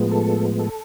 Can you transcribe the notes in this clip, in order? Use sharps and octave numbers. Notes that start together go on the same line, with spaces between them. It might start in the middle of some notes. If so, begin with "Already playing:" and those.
Already playing: A2 F3 G#3 B3
A4
A4